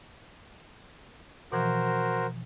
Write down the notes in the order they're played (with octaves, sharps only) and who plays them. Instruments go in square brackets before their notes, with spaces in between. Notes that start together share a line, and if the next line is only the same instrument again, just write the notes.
[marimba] B2 E3 F3 [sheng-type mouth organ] F#4 A#4 C5